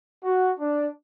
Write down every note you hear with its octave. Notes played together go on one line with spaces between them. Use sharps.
F#4
D4